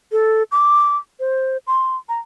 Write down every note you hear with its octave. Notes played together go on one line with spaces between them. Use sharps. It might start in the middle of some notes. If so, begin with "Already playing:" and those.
A4
D6
C5
C6
A#5